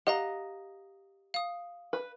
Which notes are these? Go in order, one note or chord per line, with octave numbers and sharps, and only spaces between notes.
G4 D#5 F5 F#5 A#5
F5 D#6
B4